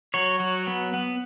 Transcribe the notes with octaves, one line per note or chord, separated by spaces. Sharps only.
F#3 C#5
F#3
B3
B3